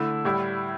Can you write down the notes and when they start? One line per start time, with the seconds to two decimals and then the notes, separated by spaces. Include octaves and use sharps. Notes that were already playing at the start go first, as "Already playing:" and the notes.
Already playing: D3 A3 E4 E6
0.25 A2 G3 E4